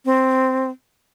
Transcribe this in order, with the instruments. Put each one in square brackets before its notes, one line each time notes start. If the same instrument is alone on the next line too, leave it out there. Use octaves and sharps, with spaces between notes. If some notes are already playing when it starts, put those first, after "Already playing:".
[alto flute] C4